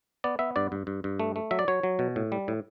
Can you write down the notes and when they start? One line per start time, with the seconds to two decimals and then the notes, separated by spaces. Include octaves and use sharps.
0.24 B3 D5
0.39 B3 E5
0.56 G2 D5
0.72 G2
0.87 G2
1.04 G2
1.20 A3
1.36 A3
1.51 F#3 E5
1.59 D5
1.68 F#3 C#5
1.83 F#3
1.99 B2
2.16 A2
2.32 G3
2.48 A2